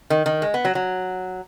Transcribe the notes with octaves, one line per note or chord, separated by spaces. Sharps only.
D#3
D#3
G#3
B3
F#3
F#3